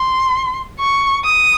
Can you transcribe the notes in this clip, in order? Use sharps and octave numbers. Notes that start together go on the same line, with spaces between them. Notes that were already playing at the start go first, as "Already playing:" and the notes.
Already playing: C6
C#6
D#6